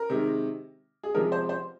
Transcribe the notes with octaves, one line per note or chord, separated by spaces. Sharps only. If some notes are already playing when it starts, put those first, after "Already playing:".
Already playing: A#4
C3 D#3 G#3
G#4
C3 F3 G#3 A#4
C5
C5